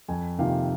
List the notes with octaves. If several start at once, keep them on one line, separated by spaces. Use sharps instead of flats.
F2 G#5
C3 D#3 A#3 F4 F5